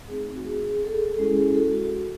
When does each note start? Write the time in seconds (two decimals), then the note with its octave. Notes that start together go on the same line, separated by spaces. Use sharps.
0.08 A3 C4 D#4 G#4
0.36 F#4
0.45 G#4
0.63 G#4
0.85 A4
0.91 G#4
1.14 A4
1.18 G#3 C#4 E4 G#4
1.37 G#4
1.55 F#4 A4
1.73 F#4